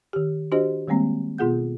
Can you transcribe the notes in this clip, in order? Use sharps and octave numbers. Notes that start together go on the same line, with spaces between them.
D#3 G4
D4 F#4 G4 C5 D#5
D#3 G3 G#3 A#3 C4
B2 B3 F4 G#4 F#5 G6